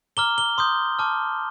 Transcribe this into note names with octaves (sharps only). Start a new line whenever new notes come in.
A#5 D6 F6 G7
G7
C6 D#6 G6
A5 D6 F6